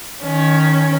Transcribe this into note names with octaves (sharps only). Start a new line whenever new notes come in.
D#3 C#4